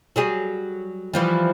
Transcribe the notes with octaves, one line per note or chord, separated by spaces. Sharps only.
F#3 G3 G#4
E3 F3 G3